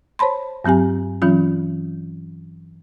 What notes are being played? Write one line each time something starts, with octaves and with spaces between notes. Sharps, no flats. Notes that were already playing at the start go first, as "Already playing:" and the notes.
C5 C#5 A5 B5 C6
G2 F#3 C4 G4 G#5
E3 F#3 C#4 F4